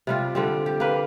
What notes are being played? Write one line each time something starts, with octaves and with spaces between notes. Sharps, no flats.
C3 G3 F4
D3 G3 C4
G4
A#3 B4